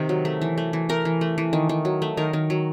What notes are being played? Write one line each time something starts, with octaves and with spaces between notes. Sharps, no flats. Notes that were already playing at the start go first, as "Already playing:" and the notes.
Already playing: C3 D#3
F#3
A3
E3
A3
E3
A3 A#4
E3
A3
E3
D#3
D#3
F#3
A3
D#3 A#4
D#3
F#3